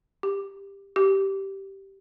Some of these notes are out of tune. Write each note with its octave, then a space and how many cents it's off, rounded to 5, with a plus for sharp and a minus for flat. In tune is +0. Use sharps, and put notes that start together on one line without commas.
G4 +15
G4 -10